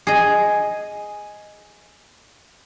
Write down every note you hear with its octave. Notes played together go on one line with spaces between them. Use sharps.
G#4 D#5